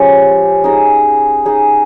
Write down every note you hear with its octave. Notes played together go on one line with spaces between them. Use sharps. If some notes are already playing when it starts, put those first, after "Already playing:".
Already playing: F3 G#3 C#4 G4
D#4 G#4 D#5
D#4 G#4 D#5